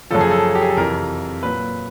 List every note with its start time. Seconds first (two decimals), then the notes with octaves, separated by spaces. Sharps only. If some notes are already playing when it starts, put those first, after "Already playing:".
0.10 F#2 C#3 F3 A4
0.21 G#4
0.31 A4
0.55 G4
0.62 G#4
0.70 A4
0.77 F2 C3 E3 A#4
1.43 A#2 F#3 B4